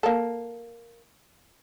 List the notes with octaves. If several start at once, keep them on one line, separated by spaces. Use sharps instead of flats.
A#3 A4